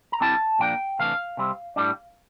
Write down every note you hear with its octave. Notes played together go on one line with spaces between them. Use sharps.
A#5
D3 G3 C4 E4 A5
A#2 F3 A#3 D4 G5
C3 E3 A3 D4 F5
C3 G3 C4
A2 G3 D4